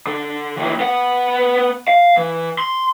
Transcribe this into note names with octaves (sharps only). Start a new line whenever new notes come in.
D3
D#2 E3
B3 F#5
F5
E3
C6